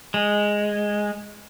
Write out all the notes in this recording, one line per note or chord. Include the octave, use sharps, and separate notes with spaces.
G#3